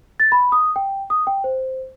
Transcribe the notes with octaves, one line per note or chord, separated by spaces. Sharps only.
A6
B5
D#6
G5
D#6
G5
C5